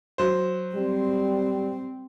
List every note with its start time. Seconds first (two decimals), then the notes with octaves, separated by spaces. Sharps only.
0.18 F#3 C5
0.75 G3 C4